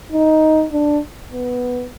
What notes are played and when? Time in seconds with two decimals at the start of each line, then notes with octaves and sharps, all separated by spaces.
0.12 D#4
0.72 D4
1.32 B3